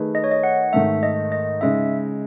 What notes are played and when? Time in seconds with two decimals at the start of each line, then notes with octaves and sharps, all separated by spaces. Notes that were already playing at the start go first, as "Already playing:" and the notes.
Already playing: D#3 A3 D#4 G#4 B4
0.15 D#5
0.24 C#5
0.31 D#5
0.43 F#5
0.73 G#2 D#3 A3 E5
1.03 D#5
1.32 D#5
1.61 C#3 G#3 D#4 E5